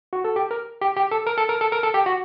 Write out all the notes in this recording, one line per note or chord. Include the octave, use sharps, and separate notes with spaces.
F#4
A4
G4
A#4
G4
G4
A4
A#4
A4
A#4
A4
A#4
A4
G4
F#4